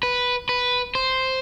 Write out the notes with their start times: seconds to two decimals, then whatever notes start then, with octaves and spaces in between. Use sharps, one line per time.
0.03 B4
0.49 B4
0.95 C5